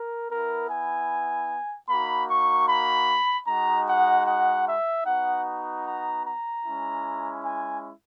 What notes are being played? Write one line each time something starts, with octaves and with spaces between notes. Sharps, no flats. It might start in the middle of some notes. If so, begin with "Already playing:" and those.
Already playing: A#4
B3 E4 A#4
G#5
A#3 D#4 F#4 B5
C#6
B5
G#3 D#4 F#4 A#5
F#5
F#5
E5
B3 D#4 F#4 F#5
A#5
A#5
G#3 C#4 E4
G#5